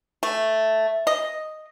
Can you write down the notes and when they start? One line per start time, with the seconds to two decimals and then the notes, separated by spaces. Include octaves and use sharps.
0.23 A3
1.07 D#5